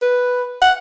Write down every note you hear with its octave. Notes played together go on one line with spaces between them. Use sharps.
B4
F#5